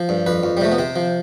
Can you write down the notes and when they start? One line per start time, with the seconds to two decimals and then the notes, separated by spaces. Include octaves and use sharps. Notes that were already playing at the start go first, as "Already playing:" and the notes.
Already playing: F3
0.09 G2
0.26 F2 B4
0.43 F2
0.57 G3
0.61 C3 A3
0.72 B3
0.78 C3 C4
0.96 F3